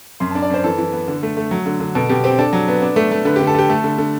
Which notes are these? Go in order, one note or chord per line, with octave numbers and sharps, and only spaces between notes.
F#2 C6
A5
D4
D5
F#2 C5
E3 A4
E3
B3
D3
A3
A3
F#3
D3
D3
B2 A4
B2 G4
C4 G4
D4 A4
F#3
B3
D4
A3
A3
D3 B4
G4
D3
A4
D3 G4
A3 A4
D3
D3